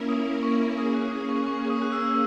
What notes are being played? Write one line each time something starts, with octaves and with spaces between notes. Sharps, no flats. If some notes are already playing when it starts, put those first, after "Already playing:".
Already playing: A#3 C#4 E4 A#4
D#6
C#6
C#6
A#3 C#4 G#4 D#6
F#6
D#6
C#6
C#6
D#6
F#6
E6